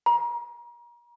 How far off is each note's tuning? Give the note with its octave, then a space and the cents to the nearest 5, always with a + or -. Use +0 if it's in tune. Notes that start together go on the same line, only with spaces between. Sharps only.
A#5 +35